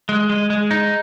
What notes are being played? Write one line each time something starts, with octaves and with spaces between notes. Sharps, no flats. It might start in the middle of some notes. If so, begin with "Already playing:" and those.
G#3
G#3
G#3
D#4